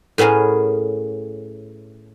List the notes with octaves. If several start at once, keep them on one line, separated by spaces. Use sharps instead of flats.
A2 B3 C#4 G#4 A#4